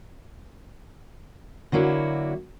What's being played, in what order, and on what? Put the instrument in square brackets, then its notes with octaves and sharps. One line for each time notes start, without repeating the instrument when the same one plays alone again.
[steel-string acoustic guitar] D3 F#3 A#3 E4 F#4